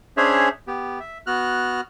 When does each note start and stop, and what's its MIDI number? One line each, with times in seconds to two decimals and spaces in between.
0.17 0.49 61
0.17 0.49 62
0.17 0.49 68
0.17 0.49 72
0.17 0.49 73
0.17 0.49 76
0.67 0.99 59
0.67 0.99 67
1.00 1.18 76
1.27 1.81 59
1.27 1.81 66
1.27 1.81 89
1.27 1.81 90